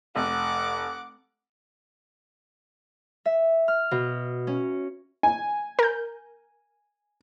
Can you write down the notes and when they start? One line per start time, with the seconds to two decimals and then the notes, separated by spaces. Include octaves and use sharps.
0.16 F1 F#5 D6
3.25 E5
3.68 F6
3.91 B2
4.47 C#4
5.23 G#5
5.79 A#4 G6